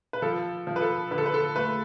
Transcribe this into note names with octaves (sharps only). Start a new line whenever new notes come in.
B4
F3 A4
F3
B4
A4
D3 B4
A4
B4
A4
A3 B4